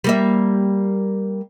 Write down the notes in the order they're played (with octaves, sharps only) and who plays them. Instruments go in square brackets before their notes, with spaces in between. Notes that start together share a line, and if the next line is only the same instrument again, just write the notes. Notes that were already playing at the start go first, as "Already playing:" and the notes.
[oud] G3 A#3 E5